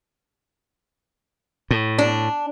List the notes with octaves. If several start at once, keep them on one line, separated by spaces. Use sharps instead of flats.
A2
D4